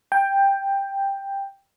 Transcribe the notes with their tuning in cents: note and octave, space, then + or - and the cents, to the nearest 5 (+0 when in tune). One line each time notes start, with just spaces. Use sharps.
G5 +10